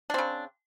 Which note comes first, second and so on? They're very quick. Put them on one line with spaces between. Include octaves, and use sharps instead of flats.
D4 C4 C#3